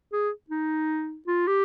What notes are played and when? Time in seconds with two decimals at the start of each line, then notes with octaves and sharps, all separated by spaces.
0.13 G#4
0.50 D#4
1.27 F4
1.47 G4